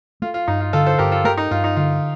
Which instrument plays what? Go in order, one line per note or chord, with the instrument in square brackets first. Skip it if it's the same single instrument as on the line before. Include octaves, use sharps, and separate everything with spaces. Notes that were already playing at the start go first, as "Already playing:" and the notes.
[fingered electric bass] A3 [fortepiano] F4
[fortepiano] F4
[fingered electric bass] G2 [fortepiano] D#4
[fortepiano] F4
[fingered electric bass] D3 [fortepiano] F4 A4
[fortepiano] A4 C5
[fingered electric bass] G2 [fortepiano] G4 A#4
[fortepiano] F4 A4
[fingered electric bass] A3 [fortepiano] G4 A#4
[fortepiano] D#4
[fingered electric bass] G2 [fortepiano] F4
[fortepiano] D#4
[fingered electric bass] D3 [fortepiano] F4